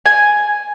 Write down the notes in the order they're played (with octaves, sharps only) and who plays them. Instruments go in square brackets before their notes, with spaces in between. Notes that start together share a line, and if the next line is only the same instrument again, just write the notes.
[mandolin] G#5